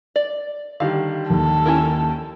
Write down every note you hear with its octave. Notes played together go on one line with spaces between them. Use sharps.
D5
D3 D#3 G3 F5
D#2 A4
C#4 E4 A#4